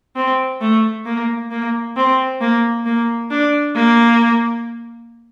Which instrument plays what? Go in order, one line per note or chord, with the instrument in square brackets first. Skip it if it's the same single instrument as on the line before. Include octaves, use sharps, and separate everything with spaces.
[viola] C4
A3
A#3
A#3
C4
A#3
A#3
D4
A#3